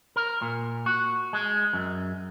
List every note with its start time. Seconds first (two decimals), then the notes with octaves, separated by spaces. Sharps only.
0.16 A#4
0.42 A#2
0.86 F#4
1.33 G#3
1.73 F#2